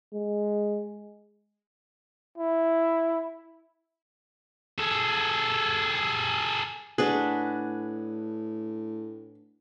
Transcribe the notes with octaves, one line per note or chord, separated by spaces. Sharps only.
G#3
E4
G#4 A4
A2 D4 F#4 G#4 B4